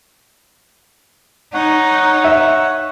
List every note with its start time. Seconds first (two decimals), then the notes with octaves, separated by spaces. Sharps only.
1.54 D#4 C#5 F#5
2.24 E5